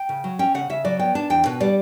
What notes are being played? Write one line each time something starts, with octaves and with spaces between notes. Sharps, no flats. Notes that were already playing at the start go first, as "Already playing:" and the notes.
Already playing: G5
C#3
F#3
C#4 G5
C#3 F#5
C#3 E5
F#3 D5
B3 G5
D4 A5
E2 G5
B2 B4
G3 D5